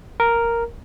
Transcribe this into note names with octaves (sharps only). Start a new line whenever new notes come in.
A#4